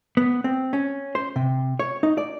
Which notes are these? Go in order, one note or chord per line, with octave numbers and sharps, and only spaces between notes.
B3
C4
C#4
C5
C3
C#5
D#4
D5